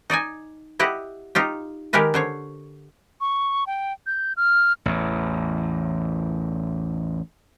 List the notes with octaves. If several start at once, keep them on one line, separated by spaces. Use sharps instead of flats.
D#4 D5 D#5 G#5
E4 G4 D#5 F#5
D#4 F4 G4
D#3 G#3 G4 A#4 B4
D3 C5 C#5
C#6
G5
G6
F6
A1 E2